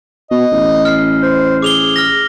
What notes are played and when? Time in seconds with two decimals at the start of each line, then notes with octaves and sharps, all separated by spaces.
0.31 B2 D#5
0.52 A1
0.85 F6 C7
1.22 C5
1.62 G#4 D6 F7 G7
1.96 F6 A#6